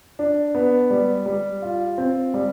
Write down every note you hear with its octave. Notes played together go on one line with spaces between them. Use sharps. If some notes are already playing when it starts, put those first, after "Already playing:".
D4
B3
G3
G3
F4
C4
G3